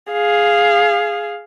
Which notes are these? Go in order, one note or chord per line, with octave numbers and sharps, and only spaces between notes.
G#4 F5